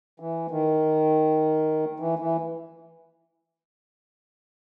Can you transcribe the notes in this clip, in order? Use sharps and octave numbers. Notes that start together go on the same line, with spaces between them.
E3
D#3
E3
E3